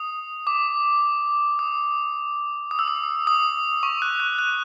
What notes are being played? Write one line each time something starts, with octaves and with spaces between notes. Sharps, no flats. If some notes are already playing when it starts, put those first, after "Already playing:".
Already playing: D#6
D6
D#6
D#6
E6
D#6
D#6
C#6
F#6
F#6
F#6